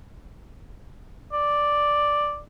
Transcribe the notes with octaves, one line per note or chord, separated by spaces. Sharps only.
D5